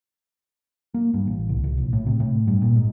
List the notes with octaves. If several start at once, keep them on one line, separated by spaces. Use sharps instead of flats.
A#3
G2
A1
C2
C2
A#1
A2
C3
A2
G2
A#2
G#2